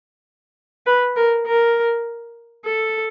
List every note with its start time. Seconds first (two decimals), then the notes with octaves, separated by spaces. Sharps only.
0.86 B4
1.16 A#4
1.46 A#4
2.65 A4